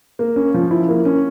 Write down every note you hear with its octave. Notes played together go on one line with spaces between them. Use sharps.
A#3
C#4
F3
E4
A#3
C#4